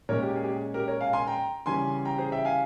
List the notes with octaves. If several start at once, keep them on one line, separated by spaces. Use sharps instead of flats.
A#2 G#3 C#4 A#4 C#5
G4
G#4
G4
G#4
G4 A#4
A#4 C#5
F5 G#5
G#5 C6
G5 A#5
C#3 E3 G3 C#4 G#5 C6
G5 A#5
G#4 C5
E5 G5
F5 G#5